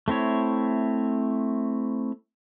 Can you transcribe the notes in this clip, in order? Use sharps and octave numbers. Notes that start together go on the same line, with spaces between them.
A3 C4 E4 C#5